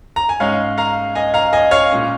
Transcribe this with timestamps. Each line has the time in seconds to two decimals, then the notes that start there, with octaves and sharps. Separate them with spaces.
0.16 A#5
0.29 G#5
0.40 G#2 G#3 C#4 C#5 F5
0.78 F5 A#5
1.15 D#5 G#5
1.34 F5 A#5
1.53 D#5 G#5
1.71 C#5 F5
1.91 A#2 G#3 C#4